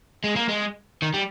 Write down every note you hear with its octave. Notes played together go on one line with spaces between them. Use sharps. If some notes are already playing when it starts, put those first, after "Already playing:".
G#3
A#3
G#3
D#3
G3